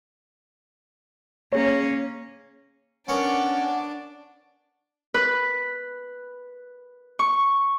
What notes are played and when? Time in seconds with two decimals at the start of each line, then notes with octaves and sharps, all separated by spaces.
1.53 A#3 C#4 G#4 C#5
3.08 B3 C#4 D4 A#4 D5 F#5 C#6
5.14 B4
7.19 C#6